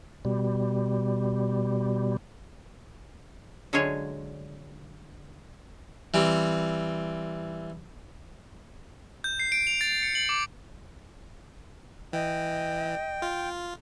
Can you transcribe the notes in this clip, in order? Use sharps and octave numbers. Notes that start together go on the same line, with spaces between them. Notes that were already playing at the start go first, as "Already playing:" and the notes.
B2 G3
D3 F#3 G#3 F4 G#4 C#5
E3 G3 C4
G6
C7
D7
F7
A6
C#7
F#7
D6
E3 D#5 G5
F4